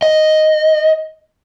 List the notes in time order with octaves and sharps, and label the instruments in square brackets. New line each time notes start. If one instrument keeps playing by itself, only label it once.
[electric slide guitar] D#5